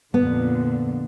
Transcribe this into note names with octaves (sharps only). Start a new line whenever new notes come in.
F2 A#2 D3 B3